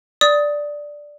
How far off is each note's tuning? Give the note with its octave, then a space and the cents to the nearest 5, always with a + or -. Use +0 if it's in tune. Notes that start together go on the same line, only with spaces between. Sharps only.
D5 +0 D#6 +15